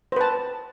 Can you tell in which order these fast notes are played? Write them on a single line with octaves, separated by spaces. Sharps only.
C5 B4 A5